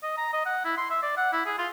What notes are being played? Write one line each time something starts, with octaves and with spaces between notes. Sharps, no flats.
D#5
A#5
D#5
F#5
E4
C6
E5
D5
F#5
E4
G#4
F4